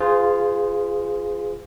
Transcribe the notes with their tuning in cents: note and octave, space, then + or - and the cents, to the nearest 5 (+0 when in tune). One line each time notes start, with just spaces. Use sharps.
F4 +0 G#4 +0 C5 -45